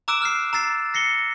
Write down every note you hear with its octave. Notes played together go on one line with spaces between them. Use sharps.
A#5 D6 E6 F#6 D7 E7
F6 F#6 C7
A#5 E6 A6 C7
A#6 C7 C#7 G7